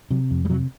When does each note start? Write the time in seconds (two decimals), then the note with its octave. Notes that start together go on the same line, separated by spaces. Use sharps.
0.11 C3 F#3
0.31 F2
0.45 G3
0.50 C3 F#3